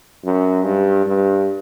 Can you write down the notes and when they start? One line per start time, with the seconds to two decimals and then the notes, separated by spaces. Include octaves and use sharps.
0.25 F#2
0.64 G2
1.06 G2